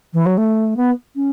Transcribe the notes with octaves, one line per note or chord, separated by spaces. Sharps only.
E3
F#3
A3
B3
C#4